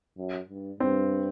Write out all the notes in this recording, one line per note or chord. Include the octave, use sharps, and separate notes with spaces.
F#2
G2
G2 C4